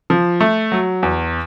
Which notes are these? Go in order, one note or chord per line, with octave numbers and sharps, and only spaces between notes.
F3
A3
F#3
E2